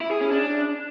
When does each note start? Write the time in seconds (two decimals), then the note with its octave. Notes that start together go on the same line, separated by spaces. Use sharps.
0.01 E4
0.11 G#4
0.21 C#4
0.31 D4